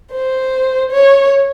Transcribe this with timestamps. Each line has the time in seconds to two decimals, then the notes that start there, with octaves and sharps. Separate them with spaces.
0.12 C5
0.91 C#5